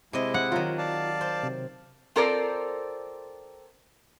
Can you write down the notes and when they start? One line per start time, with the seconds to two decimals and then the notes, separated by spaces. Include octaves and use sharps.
0.13 C3 G#3 E4 D#5
0.34 F#5
0.52 D#3 F#3 F4
0.78 D5 F5 A5
1.21 C5
1.43 C3
2.16 C4 F4 A4 A#4 C5 D5